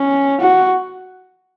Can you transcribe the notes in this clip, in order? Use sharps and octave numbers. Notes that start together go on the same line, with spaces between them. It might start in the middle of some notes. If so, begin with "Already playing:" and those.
Already playing: C#4
F#4